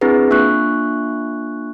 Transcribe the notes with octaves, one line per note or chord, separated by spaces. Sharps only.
C4 D4 E4 G#4 B4
A#3 D4 F4 C#6 F#6